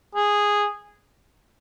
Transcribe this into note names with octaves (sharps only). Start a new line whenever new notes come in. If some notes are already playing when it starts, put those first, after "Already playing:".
G#4